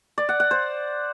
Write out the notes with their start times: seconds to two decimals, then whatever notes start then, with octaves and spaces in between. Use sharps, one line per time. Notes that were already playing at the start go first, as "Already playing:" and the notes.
0.18 D5
0.29 F#5
0.40 F#5
0.51 C5